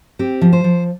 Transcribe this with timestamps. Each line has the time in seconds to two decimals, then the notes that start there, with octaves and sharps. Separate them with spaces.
0.19 C4 G4
0.41 F3
0.53 C5
0.64 F3